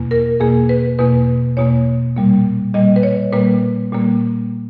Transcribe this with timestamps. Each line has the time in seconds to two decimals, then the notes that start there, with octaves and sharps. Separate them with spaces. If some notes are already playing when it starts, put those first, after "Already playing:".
Already playing: E2 B2 A#3
0.11 A#4
0.40 E2 B2 A#3 G#4
0.69 B4
0.98 E2 B2 A#3 B4
1.57 E2 B2 A#3 C#5
2.16 A#2 G3 A#3
2.74 A#2 G3 A#3 D#5
2.96 B4
3.03 C#5
3.33 A#2 G3 A#3 B4
3.92 A#2 G3 A#3